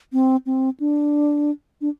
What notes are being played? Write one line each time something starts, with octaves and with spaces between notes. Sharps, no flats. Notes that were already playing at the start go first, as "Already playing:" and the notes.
C4
C4
D4
D4